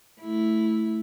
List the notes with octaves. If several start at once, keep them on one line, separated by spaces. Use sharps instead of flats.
A3 E4